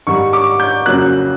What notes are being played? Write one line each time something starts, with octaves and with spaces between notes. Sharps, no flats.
G#2 D#3 G3 C#6
D6
G6
F2 C#3 F#3 A#3 F#6